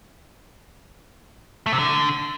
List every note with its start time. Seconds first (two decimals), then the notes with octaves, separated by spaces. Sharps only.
1.66 A3
1.73 C3
1.79 D3